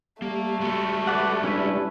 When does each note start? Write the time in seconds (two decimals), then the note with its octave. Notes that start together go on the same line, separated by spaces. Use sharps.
0.22 G3 A3 A#3
0.60 G#3 F#4 A4
1.07 B4 D5 F#5
1.44 G3 C#4 D4 E4 B4